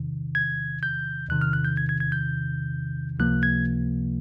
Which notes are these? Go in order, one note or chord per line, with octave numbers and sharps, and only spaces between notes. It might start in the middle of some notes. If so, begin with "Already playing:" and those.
Already playing: E2 C3 D#3
G#6
G6
E2 C3 D#3 F#6
F6
F#6
G6
G#6
G#6
G#6
G6
C#2 C3 F3 A#3 F#6
G#6